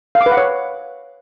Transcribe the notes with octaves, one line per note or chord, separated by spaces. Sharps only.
F5
D6
B4
F#5
C#5